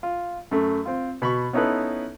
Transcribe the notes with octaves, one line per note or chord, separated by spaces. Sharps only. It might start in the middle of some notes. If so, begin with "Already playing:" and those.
F4
F#2 A3
C4 F4
B2 B5 C#6
B3 C#4 D#4 E4 A4 B4